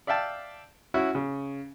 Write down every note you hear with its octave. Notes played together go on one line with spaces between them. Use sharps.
D5 E5 F5 G5 A5
C#4 E4 F#4
C#3